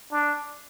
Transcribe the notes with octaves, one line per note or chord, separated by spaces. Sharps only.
D4